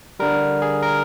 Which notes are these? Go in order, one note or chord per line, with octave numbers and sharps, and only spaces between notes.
D3 G3 A#4
G#4
A#4